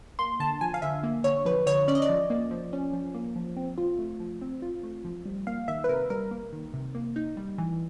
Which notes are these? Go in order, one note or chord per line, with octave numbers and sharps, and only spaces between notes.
A#3 C6
D3 A5
F3 G#5
F5
D3 E5
A#3
D3 C#5
F3 B4
D3 C#5
C#4 D5
D#5
D5
F3
A#3
F3
C#4
F3
A#3
F3
C4
F4
A3
F3
C4
F4
A3
F3
G3
A#3 F5
D#3 E5
B4
C3 A#4
G3 A#4
A#3
D#3
C3
A#3
D#4
G3
E3